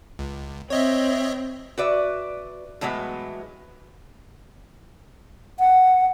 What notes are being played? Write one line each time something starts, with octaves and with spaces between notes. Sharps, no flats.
C#2
C4 C#5 D#5 E5
F#4 B4 D5 E5
A2 E3 F#3 G#3 B3
F#5